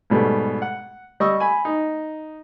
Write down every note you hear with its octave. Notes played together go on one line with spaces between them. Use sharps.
G#2 B2 G3 A3
F#5
G3 D#5 C#6 E6
G#5 B5
D#4